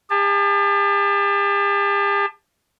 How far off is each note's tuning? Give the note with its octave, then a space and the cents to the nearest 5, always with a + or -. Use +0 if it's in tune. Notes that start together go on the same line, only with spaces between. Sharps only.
G4 +45 A5 +0